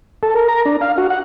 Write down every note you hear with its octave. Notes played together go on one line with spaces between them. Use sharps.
A4
A#4
A#5
D4
F5
F#4
F#5